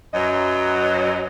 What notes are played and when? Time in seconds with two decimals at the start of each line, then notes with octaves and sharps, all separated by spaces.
0.14 F#2 F#3 B4 D#5